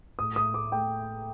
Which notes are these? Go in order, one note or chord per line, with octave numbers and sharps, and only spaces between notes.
A2 D#6
A2 D#6
A3 D6
A3 G5